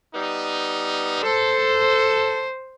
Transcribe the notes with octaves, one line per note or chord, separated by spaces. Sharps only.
G3 B3 D#4
A4 C5